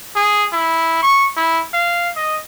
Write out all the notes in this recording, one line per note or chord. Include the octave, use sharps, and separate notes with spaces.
G#4
E4
C#6
E4
F5
D#5